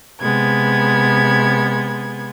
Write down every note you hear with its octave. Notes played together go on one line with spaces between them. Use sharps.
C3 G#3 B3 G#6